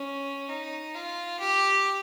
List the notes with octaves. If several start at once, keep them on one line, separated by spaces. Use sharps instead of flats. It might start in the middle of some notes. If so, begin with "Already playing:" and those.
Already playing: C#4
D#4
F4
G4